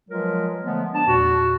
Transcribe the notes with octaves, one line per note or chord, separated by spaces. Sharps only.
F3 F#3 G#3 F4 A#4 B4
D3 F3 G#3 A3 B3
D4 A5
E2 A#2 F#4